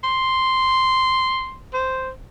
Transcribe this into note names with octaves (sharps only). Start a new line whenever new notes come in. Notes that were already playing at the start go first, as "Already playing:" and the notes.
C6
C5